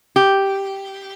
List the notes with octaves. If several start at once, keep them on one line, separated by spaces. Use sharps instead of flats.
G4